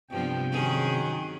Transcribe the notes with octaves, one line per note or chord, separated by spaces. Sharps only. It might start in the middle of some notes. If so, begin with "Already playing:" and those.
G2 C3 F3 B3 G5
D#3 F#3 C#4 G#4